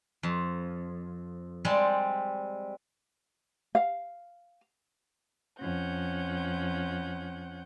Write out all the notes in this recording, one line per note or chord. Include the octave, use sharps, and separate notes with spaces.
F2
G3 G#3 C4 D5 A5
F5
F2 C#4 F#5 G6